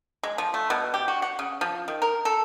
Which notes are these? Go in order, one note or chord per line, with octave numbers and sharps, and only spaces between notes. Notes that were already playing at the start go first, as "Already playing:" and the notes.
G#3
F3
A3
B2
G4
F#4
F#5
C#3
F3
D#3
A#4
A4